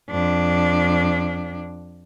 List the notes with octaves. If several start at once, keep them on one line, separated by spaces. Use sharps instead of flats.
F2 D4